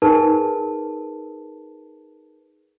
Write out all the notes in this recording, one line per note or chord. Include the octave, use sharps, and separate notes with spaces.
D#4 G#4 A#4 B4 A5